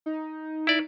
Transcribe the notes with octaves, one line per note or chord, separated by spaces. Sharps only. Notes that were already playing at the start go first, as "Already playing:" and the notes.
D#4
E4 D5